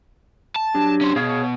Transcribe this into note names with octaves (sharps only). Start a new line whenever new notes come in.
A5
F#3 D4 G4
C#4 C5
B2 G#4 C#5 F5